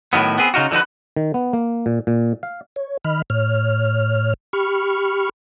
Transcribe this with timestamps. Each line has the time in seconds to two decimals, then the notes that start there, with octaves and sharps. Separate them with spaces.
0.13 A2 D#3 F#3 B3
0.38 B3 C4 G#4
0.54 C#3 D#4 F4 F#4
0.71 D3 F3 D#4 F#4 B4
1.16 D#3
1.34 B3
1.53 A#3
1.86 A#2
2.07 A#2
2.43 F5
2.76 C#5
3.04 D#3 D#5 B5 F6
3.30 A2 C#5 F6
4.53 G4 B5 C#6 F6